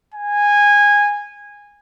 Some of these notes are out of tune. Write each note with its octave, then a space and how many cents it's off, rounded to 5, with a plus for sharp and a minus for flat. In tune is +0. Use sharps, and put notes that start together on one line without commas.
G#5 -15